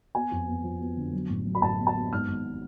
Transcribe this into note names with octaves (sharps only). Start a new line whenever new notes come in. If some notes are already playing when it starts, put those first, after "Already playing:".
B3 G#5
F2
B3
F3
B3
D3
F#3
A1
F#3
B5
A1 A5
B3
A5
B3
G#2 F6
G#1